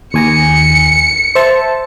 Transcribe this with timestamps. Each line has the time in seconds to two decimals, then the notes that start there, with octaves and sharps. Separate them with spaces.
0.14 D#2 G#5 A#6 C#7
1.35 C5 E5 A5